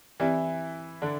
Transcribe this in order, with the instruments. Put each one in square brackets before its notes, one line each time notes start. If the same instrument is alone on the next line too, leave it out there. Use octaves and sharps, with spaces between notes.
[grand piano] E3 E4 [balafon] C4 G4 D5
[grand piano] D3 D4